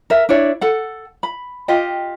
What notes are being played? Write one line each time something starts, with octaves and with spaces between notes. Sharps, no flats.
A#4 E5
D4 E4 C#5 D5
A4 F#5
B5
F4 G4 D#5 G5